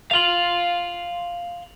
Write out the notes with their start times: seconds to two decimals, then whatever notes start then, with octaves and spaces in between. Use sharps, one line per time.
0.11 F5 C6 F7 F#7